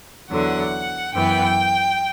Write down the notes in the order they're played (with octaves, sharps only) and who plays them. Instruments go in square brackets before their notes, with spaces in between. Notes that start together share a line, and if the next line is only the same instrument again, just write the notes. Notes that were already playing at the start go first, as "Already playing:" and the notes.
[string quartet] E2 D3 F#3 F#5
F#2 E3 B3 G5